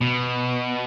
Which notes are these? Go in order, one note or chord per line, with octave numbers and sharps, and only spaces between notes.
B2